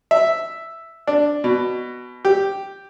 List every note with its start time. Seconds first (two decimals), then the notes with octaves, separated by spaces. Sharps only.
0.11 E5
1.07 D4
1.44 B2
2.25 G4